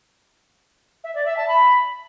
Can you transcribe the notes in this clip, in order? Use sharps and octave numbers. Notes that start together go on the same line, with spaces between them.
E5
D5
E5
A5
B5